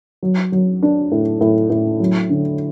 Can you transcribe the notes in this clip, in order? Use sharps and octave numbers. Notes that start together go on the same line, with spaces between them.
F#3
F#3
D4
A2
A2
A2
F#3
D3